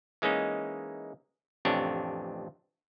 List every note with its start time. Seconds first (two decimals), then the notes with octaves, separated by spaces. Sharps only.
0.22 E3 G#3 A#3 C#4 D#4
1.65 A1 F2 C3 D4 C#5